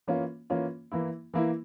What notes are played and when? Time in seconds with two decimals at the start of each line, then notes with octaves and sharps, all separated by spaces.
0.07 E3 A#3 C#4 F4
0.50 E3 A#3 C#4 F4
0.92 E3 A#3 E4
1.34 E3 A#3 E4